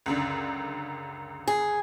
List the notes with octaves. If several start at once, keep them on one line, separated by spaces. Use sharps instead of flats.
C#2 F#2 D3
G#4